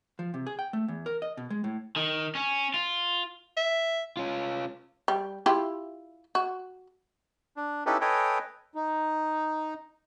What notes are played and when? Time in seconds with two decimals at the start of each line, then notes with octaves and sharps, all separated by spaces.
0.19 F3
0.34 C3
0.47 G#4
0.59 G5
0.73 A3
0.88 E2
1.06 A#4
1.22 D#5
1.37 B2
1.50 G#3
1.64 A2
1.96 D#3
2.35 C#4
2.74 F4
3.57 E5
4.17 C#4 F4
5.08 G3
5.46 E4 F4 G4
6.35 F#4
7.56 D4
7.86 C#4 D#4 E4 G4 A4 B4
8.01 A4 B4 C#5 D#5 G5 G#5
8.75 D#4